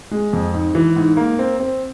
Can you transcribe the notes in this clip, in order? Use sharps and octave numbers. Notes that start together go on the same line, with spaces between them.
G#3
F2
G#2
E3
G#2
A#3
C4
C4